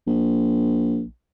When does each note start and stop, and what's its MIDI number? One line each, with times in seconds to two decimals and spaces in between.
0.07 1.04 34